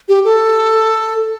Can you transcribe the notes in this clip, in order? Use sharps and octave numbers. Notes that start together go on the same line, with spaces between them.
G4
A4